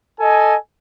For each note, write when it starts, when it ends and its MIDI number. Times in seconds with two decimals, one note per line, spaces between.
0.20 0.56 69
0.20 0.56 75
0.20 0.56 80